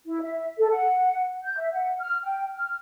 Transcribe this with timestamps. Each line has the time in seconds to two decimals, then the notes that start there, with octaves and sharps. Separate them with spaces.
0.06 E4
0.21 E5
0.58 A4
0.70 F#5
1.44 G6
1.57 E5
1.73 F#5
1.99 F6
2.23 G5
2.55 F6